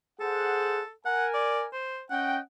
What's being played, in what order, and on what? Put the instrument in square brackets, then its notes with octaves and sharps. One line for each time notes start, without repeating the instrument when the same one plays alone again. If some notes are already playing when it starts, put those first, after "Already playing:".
[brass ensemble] G#4 C5 F#5 [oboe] A4
[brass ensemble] A#4 G#5 [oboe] F#5
[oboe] D5
C5
[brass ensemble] C#4 D#5 G5 [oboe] F#5